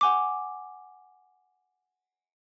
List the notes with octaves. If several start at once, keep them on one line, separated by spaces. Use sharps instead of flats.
F#5 G#5 D6